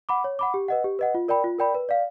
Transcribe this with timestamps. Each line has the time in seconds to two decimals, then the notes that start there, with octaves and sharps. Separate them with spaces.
0.09 F#5 B5 D6
0.24 C#5
0.39 F#5 B5 D6
0.54 G4
0.68 B4 D#5 F#5
0.84 G4
0.99 B4 D#5 F#5
1.15 F4
1.28 A#4 D5 G5 B5
1.44 F4
1.59 A#4 D5 G5 B5
1.74 B4
1.89 D5 F5